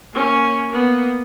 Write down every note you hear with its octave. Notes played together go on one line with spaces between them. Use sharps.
A#3 C#4
A#3 B3